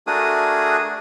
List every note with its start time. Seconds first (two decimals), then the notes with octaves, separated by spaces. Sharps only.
0.07 A3 D4 F#4 G#4 A#4 D#6